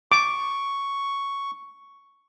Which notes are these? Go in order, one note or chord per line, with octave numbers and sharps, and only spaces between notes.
C#6 D6